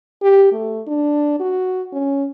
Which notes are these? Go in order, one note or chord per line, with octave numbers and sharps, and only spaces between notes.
G4
A3
D4
F#4
C#4